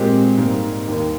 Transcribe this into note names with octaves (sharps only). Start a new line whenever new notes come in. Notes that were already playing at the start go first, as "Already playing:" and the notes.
Already playing: A#2 G#3 C4 G4
G#2 G3 A#3
D#2 D#3 A#3